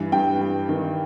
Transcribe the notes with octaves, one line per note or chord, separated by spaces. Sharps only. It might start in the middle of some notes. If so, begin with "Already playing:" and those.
Already playing: G2 E3
G2 G5
G2
D#3